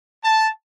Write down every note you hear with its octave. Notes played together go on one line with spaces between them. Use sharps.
A5